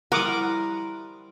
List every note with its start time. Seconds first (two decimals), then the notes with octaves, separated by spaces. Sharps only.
0.12 G3 E4 A#4 C5 F#5 D6 D#6